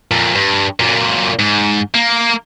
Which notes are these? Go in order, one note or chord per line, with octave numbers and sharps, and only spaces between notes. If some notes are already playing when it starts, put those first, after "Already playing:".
F2 A#2
G2
F#2 A#2
G#2
A#3